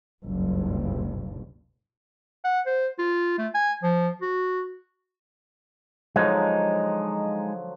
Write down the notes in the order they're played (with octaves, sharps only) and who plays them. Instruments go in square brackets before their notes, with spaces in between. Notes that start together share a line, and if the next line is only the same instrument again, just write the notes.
[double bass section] F#1 C#2 G2 B2
[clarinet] F#5
C5
F4
A3
G#5
F3
F#4
[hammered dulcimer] D3 F3 F#3 [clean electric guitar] G#3 D#4